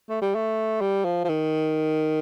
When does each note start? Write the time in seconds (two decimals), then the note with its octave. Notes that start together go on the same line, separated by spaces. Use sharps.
0.09 A3
0.21 G3
0.35 A3
0.81 G3
1.05 F3
1.24 F3
1.29 D#3